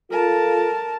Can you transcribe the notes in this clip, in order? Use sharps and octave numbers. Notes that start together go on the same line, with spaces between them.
F4 A4 A#4 A5